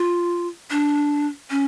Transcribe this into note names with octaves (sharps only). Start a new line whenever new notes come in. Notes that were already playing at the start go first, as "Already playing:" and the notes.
Already playing: F4
D4
C#4